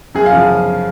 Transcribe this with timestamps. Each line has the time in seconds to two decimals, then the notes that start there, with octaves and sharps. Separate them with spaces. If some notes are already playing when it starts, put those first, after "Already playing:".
0.14 F#2 G#4
0.26 F5
0.33 C#3 F3